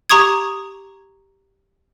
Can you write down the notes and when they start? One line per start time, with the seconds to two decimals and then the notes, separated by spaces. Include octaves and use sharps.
0.10 G4 A#5 C#6 D#6 G#6